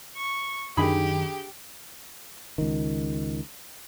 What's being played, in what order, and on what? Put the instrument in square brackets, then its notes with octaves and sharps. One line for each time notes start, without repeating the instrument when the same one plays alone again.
[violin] C#6
[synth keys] F#2 D#3 D#4 [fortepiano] D3 G#4 B5 [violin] G4
[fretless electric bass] C#2 D#3